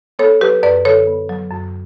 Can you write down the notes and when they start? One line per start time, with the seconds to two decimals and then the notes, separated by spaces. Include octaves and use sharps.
0.19 B3 A4 C#5
0.41 F#3 G4 B4
0.63 F#2 B4 D5
0.85 D3 A4 C#5
1.07 B3
1.29 F#3
1.51 F#2